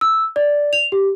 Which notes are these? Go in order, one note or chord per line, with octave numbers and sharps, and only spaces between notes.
E6
D5
F7
G4